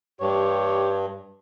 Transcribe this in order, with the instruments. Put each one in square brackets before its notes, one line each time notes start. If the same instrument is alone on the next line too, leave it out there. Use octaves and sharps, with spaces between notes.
[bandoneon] G2 [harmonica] G4 C#5